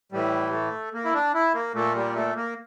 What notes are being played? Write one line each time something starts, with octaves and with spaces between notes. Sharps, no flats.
A2 E3 G3
A3
A#3
E4
D4
E4
A#3
A#2 A3
G3
A3
A#3